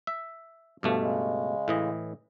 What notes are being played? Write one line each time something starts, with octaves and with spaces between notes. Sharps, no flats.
E5
G2 B2 F3 A3
C#3 G#3
A2 E3 D#5